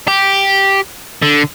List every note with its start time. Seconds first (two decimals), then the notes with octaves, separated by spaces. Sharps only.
0.08 G4
1.22 D3